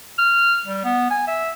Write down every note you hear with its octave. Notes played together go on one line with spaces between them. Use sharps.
F6
G3
B3
G#5
E5